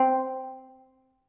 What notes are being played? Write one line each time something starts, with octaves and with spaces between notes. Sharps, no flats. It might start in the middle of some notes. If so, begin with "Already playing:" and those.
Already playing: C4